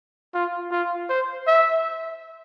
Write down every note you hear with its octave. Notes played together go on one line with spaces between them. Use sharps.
F4
F4
C5
E5